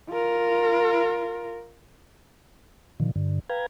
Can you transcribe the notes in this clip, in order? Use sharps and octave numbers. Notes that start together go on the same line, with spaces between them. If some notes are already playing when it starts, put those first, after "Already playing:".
F4 A#4
A#2 D3 D#3 F3
G2 D3
B4 F5 G5 A#5 G#6